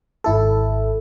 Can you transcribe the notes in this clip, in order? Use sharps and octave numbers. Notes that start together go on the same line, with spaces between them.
G#1 E4 A4